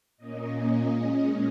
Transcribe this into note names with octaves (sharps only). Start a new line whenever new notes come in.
A#2 A#3 C#4 D#5
D#5
A#2 G#3 C#4 D#5